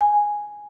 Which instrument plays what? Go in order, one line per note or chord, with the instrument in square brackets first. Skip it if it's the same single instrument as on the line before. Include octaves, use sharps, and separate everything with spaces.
[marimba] G#5